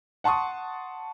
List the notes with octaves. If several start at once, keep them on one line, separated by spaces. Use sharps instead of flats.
F#5 A5 C6 C#6 D#6